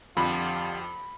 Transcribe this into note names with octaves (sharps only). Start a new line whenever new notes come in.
F2 D3 F3 G3 F4 B5